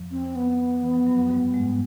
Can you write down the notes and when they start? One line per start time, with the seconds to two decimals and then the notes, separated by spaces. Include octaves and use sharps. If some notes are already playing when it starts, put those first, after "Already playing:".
Already playing: F2 F3
0.11 C4
0.35 B3
0.80 E3
0.94 F3
1.07 F#2 F#3
1.30 G2 G3
1.54 G#2 G#3